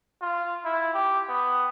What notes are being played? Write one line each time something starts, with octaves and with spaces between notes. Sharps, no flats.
F4
E4
G4
B3